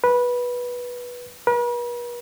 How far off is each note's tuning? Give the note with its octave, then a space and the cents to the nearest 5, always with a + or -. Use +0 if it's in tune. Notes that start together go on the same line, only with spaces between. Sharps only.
B4 -15
B4 -45